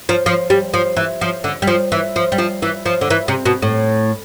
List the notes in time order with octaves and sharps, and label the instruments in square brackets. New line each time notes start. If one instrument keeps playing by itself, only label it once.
[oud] F3
F3
G3
F3
E3
F3
D3
G3
F3
E3
F3
G3
F3
E3
F3
D3
E3
C3
B2
A2